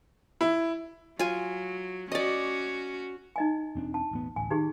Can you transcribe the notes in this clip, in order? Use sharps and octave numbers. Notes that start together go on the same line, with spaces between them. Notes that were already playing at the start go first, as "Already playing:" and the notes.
E4
F#3 F4 G#5
C#4 F#4 D5 D#5
D#4 D#5 G#5
E1 C4 D4
A5
E1 A1 B3
D1 A1 G#5
D#3 D#4 G4 G#4